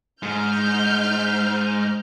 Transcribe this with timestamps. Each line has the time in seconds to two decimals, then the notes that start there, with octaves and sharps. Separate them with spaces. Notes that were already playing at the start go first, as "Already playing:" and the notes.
0.23 G#2 F6 G6